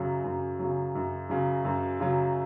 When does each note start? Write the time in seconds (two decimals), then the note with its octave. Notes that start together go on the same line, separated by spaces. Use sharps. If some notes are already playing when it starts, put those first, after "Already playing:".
Already playing: F#2 C#3 F#3
0.24 F#2
0.59 C#3 F#3
0.95 F#2
1.29 C#3 F#3
1.65 F#2
2.00 C#3 F#3